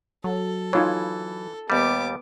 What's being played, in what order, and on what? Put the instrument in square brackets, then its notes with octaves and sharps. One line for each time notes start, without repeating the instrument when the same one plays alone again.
[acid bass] F#3 [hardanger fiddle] A4
[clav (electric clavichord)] E3 [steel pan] D#4 F4 C#5
[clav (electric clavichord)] D#2 G3 [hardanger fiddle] B3 D6